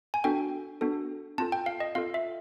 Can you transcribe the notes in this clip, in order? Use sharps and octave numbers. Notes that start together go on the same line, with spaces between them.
G#5
B3 D4 F#4 A4 G5
B3 D4 F#4 A4
C4 F4 A4 A5
G5
F5
D#5
C4 F4 A4 F5
E5